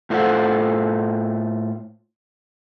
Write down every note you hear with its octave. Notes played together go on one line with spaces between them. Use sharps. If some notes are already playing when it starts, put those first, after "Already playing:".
A2 A3 F4 A4 C5 F#5